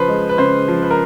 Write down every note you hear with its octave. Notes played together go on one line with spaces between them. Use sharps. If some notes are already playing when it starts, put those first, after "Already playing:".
Already playing: C#3 F3 B4 C5
G#3
B4
C#3 C5
F3
B4
A#4